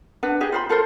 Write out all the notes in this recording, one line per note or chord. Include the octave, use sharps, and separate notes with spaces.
D4 B4 F#5
G4 G#4 D#5
F4 C5 B5
F4 A4 A#4 C5